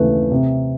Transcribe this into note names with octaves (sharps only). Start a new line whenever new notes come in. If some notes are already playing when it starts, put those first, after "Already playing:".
Already playing: D#2 C#3 E3 A3 B4
C3